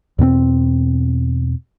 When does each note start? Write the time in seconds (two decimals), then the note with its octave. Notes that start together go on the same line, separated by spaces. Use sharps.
0.18 E2 B2 A#3 C4